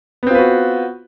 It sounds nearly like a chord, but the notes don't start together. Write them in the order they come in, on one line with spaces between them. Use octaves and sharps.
B3 C4 F4 B4 F#4